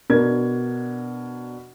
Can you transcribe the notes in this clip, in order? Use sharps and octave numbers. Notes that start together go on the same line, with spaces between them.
B2 D4 A#4 G#6